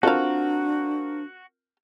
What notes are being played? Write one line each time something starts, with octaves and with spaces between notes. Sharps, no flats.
C4 D4 F4 F#4 A4 A#4 F5